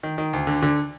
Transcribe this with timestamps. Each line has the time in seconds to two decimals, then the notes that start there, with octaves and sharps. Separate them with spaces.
0.03 D#3
0.18 D#3
0.33 D2
0.47 D3
0.63 D3